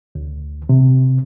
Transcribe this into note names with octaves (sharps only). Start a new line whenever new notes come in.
D2
C3